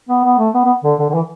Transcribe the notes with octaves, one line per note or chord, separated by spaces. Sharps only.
B3
B3
A3
B3
B3
D3
D3
D3
E3